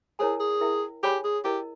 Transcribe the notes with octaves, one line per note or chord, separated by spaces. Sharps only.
E4 G#4 A#4 C#5 G#5
G#4
E4 A#4 E5 G5
G4 G#4 C#5 G#5 B5
G#4
E4 G4 A#4 D#5